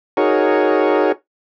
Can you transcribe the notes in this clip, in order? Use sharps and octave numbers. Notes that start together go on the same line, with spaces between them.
D#4 F#4 G#4 A#4 C#5